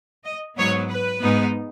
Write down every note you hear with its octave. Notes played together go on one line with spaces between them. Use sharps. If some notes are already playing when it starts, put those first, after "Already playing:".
D#5
G#2 F#3 B3 C#5
B4
G#2 G#3 B3 D#4